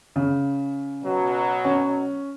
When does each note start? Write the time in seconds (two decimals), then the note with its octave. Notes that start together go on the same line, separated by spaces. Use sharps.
0.16 C#3
1.03 B2 F#3
1.64 C#4